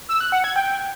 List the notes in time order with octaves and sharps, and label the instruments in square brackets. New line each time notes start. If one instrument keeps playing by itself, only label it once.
[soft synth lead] E6
F#6
F#5
G#6
G5